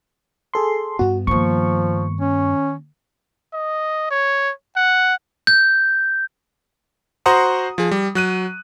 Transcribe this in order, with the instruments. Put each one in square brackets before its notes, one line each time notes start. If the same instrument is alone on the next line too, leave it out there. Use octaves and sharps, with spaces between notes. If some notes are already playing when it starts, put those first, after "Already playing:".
[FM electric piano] G#4 A4 C6
[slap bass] G2 B3 [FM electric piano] F#4
[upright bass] D#3 A#3 [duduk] F3 [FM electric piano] C#6
[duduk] C#4
[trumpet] D#5
C#5
F#5
[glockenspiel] G6
[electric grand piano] F#4 C5 F#5 A#5 C6 D#6
F3 G#4
G3
F#3 F#6 D#7